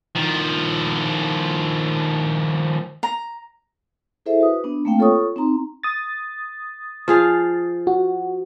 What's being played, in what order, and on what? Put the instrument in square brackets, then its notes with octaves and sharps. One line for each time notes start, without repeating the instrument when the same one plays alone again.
[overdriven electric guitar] D#3 F3
[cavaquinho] A#5
[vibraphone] E4 G#4 A4 C5 E5
F#4 B4 D#6
B3 D4
A3 A#3 C4 F5 G5
F4 A4 C#5 C#6 D#6
C4 D#4 A#5 C6
[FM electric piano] D#6 A6
[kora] F3 G#4 F5
[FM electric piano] F#4